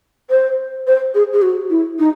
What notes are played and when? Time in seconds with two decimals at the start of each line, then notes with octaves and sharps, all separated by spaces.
0.30 C5
0.87 C5
1.15 G#4
1.33 G#4
1.42 F#4
1.70 E4
1.99 D#4